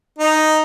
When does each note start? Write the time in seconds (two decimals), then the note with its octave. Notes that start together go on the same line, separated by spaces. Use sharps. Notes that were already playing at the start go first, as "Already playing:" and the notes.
0.18 D#4